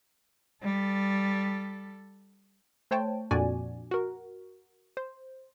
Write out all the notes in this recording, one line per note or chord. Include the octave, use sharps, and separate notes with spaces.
G3 A4
A3 C5 C#5 G5 A5
F2 A#2 D4 F#4 D5 G#5
F#4 A#4
C5